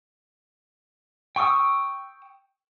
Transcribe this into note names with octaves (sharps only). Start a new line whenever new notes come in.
G5 C#6 D#6 E6